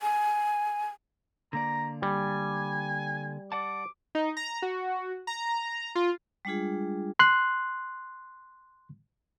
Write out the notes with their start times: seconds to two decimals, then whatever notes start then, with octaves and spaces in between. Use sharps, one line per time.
0.01 G#5
1.53 D3 A#3 D5 A#5
2.02 G3 G#5
3.52 D5 F#5 A5 D6
4.15 D#4
4.37 A#5
4.62 F#4
5.27 A#5
5.95 F4
6.45 G3 G#3 D4 F4 G#4
7.19 C6 F#6